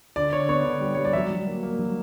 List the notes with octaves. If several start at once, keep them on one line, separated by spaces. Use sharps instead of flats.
D3 D5
D3 C#5
B3 C#5
D3
G3
G3 C#5
D5
F#3 E5
F#3
A#3
A#3
F#3